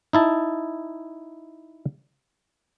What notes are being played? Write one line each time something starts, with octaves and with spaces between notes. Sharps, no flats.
D#4 E4 A5